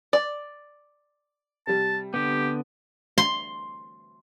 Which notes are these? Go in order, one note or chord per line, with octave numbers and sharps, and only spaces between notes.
D5
C3 G3 A5
D3 B3 G4
C6